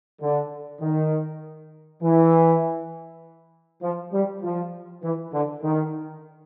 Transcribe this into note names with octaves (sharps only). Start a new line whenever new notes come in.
D3
D#3
E3
F3
G3
F3
E3
D3
D#3